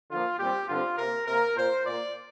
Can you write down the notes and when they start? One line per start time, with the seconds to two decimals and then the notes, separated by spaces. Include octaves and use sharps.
0.11 D3 F3 A#3 F4
0.39 A#2 G3 C4 G4
0.69 G2 D3 G3 C4 F4
0.98 C3 A#3 A#4
1.28 C3 A#3 A#4
1.56 A#2 A#3 C5
1.85 A#2 A#3 D5